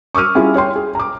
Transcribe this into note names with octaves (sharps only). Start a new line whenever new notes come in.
C#6 D6 E6 F6 D#7
G3 C#4 E4 F4 G#4
C#5 G5 C6
G#4
A#5 D6